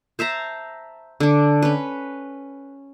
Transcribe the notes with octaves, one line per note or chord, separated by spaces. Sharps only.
C5 E5 A5 A#5
D3 D4
C#4 B4